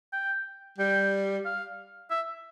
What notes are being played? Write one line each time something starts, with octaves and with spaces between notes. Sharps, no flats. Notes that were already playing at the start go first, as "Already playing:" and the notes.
G5
G3 G5
F5
E5